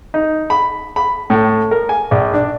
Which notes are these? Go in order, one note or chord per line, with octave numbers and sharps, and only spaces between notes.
D#4
B5
B5
A2
A#4
G#5
A#1
D4